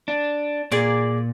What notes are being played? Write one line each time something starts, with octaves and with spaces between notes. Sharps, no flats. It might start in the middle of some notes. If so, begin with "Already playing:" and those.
D4
A#2 G#4 D5 D6